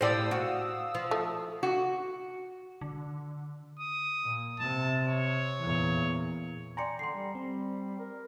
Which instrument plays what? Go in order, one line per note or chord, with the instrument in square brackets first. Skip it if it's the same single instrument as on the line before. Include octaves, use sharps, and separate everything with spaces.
[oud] A2 G4 [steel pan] C5 D5 [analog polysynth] F5 D#6 E6
[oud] F#4
F3
[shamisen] A3
[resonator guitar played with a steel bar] F#4
[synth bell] D3
[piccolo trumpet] D#6
[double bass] A#2
[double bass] C3 [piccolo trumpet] A5
[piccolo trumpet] C#5
[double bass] E2 A#2
[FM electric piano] D5 G5 A#5 [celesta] G#5 C6 C#7
[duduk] D3 [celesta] C6 C7
[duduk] G3
[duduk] G3 [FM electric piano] C4
[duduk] A#4